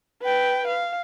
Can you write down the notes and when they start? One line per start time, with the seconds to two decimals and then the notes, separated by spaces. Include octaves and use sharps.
0.23 B4 G5
0.68 F5